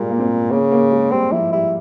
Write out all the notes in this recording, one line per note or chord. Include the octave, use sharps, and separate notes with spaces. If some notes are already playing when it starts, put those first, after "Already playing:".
Already playing: A#2 G3 G#3 A#3
A#3
C4
C#3 A#3
A#3
G#3
G3 C4
F3 E4
G3 E4